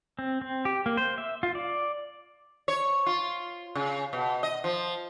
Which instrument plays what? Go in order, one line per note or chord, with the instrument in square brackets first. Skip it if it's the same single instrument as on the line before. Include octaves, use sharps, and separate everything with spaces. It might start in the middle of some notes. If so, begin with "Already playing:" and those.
[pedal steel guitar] C4
C4
G4
A#3
C5
E5
F4
D5
[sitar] C#5
F4
C#3
B2
D#5
F3